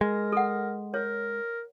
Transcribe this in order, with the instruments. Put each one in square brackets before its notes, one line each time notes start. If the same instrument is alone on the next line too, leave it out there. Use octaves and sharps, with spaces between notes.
[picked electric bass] G#3 [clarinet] A#4
[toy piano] A4 F#5
[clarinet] A#4 [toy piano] C#5